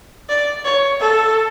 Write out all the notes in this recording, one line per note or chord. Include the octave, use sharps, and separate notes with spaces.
D5
C#5
A4